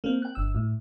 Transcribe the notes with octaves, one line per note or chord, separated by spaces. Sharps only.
A#3 C4
G5 F#6
G1 E6
A2